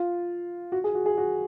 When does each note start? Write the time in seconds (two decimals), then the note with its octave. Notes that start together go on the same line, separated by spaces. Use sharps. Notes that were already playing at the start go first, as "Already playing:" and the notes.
Already playing: F4
0.72 F#4
0.84 G#4
0.95 F#4
1.06 G#4
1.18 F#4